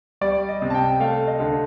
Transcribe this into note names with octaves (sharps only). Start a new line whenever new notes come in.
G3 D5
D#5
C3
A5
G5
A3 F5
D#5
D3